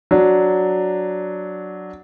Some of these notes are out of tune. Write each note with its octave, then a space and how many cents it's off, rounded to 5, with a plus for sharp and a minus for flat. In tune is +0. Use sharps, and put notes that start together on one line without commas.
F#3 +0 D4 +0